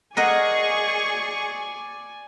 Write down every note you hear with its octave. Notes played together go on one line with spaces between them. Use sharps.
G#4 A#4 D5 D#5 F#5 G#5 C#6